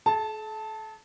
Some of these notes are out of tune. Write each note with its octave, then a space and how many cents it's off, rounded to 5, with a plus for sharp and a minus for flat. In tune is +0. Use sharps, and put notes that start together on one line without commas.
A4 -45 A5 +0